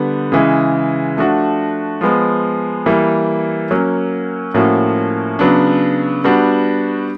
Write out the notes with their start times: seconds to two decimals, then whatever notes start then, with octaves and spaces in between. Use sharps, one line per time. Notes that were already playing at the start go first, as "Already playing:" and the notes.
Already playing: D3 G3 B3
0.32 C#3 E3 G#3
1.17 F3 A3 D4 F#4
2.01 F3 G#3 B3
2.86 E3 G3 A#3
3.71 F#3 A#3 C#4
4.54 A2 F3 A#3 C#4 F#4
5.39 C#3 F#3 B3 D4
6.24 G3 B3 D4 F#4